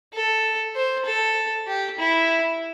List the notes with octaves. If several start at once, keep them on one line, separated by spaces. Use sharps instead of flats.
A4
C5
A4
G4
E4